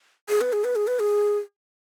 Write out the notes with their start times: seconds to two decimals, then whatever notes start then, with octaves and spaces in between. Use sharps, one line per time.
0.29 G#4
0.41 B4
0.53 G#4
0.64 B4
0.76 G#4
0.87 B4
1.00 G#4